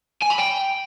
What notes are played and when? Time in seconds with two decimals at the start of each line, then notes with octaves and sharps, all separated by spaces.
0.22 G#5
0.30 B5
0.38 G5